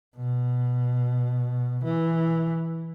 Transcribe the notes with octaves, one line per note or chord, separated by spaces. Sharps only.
B2
E3